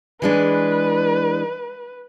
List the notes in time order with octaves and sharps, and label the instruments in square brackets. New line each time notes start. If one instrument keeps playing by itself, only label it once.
[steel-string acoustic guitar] E3 G#3 D4 [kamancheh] B4